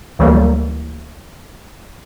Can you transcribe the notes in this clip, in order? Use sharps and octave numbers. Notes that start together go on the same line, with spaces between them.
D2 E3 F#3 G3 A3 A#3